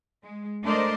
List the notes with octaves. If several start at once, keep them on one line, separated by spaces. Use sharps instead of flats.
G#3
A3 D4 A#4 C5 D5 D#5